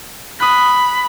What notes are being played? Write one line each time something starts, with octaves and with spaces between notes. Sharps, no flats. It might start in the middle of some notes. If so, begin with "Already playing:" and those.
B5 D#6 F#6